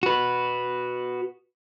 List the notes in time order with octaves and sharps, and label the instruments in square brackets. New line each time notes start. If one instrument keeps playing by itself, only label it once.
[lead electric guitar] F#4 B4